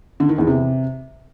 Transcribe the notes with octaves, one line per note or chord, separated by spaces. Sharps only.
D3
D#3
E2
C3